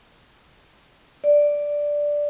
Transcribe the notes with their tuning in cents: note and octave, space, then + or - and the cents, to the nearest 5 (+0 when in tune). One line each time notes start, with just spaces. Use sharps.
D5 +0